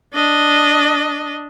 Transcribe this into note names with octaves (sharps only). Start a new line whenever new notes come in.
D4 D#5